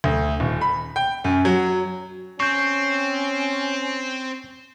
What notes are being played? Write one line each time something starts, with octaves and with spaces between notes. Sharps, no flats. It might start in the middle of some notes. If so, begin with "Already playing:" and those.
D2
D#1
B5
G5
F#2
F#3
C4 C#4 C#6 G6